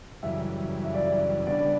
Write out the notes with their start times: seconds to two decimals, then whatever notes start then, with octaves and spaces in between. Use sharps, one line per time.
0.23 F#2 C#3 E3 G3 E5
0.85 E5
0.94 D5
1.05 E5
1.47 C#3 G3 B3 D4 D5